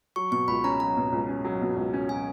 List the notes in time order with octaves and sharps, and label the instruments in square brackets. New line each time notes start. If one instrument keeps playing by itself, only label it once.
[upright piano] F#3 [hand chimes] C#6
[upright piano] B2 [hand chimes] C#6
[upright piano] C#2 [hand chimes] B5
[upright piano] C#4 [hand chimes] A#5
[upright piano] F#3 [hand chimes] A#5
[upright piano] B2
C#2
C#4
F#3
B2
C#2
C#4
[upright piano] F#3 [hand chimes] G#5